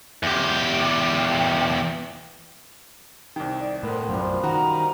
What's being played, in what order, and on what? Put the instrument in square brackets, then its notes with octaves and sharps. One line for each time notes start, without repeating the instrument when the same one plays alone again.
[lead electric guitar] E2 G4
[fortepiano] C2 D#3
[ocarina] D5 [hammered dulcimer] D6
[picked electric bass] A2 [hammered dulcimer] B3 C5 [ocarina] A#4
[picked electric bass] B1 F#2 [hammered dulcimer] F3 G3
[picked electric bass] D#3 [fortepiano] F#4 [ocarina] A#5